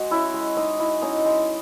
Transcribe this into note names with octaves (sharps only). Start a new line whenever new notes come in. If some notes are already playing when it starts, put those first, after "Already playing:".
Already playing: G#3 F#4
C#4 E4 E5
G#3
G#3 D#4 D#5
E4
C#4 D#4 D#5
G#3